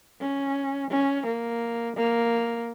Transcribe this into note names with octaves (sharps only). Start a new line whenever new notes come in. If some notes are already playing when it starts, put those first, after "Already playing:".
C#4
C#4
A#3
A#3